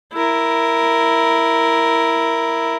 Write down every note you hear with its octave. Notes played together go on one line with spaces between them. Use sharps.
E4 A#4